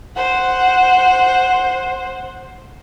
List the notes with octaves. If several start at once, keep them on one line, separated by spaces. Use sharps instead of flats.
C5 F#5